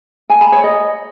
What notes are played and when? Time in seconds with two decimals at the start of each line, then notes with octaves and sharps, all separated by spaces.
0.30 G#5
0.41 B5
0.52 C#5
0.64 D#5